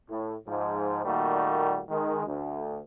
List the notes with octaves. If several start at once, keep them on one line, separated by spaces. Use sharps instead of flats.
A2
G#2 F3
A#2 D#3 G3 A3 A#3 F#4
D#3 G#3
D2